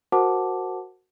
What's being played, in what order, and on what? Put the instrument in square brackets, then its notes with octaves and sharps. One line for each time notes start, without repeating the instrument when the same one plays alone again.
[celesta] F#4 A#4 C5 F#5 A5 D6